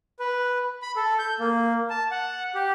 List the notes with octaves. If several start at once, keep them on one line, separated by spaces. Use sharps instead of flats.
B4
B5
A4
G6
A#3
A5
F#5
G4